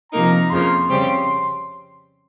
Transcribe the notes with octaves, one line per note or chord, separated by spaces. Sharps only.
C3 F3 A#3 D#4 A#4 A#5
F2 C#3 F3 A#3 C6
C#3 G3 C4 G4